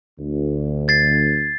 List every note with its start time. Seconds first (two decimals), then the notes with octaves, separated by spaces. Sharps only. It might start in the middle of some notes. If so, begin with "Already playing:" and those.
0.18 D2
0.88 G#6 A6 C7